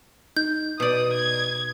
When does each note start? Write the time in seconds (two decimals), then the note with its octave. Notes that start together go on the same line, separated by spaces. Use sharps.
0.37 D#4 G6
0.80 B2 D5 D#6
1.13 G#6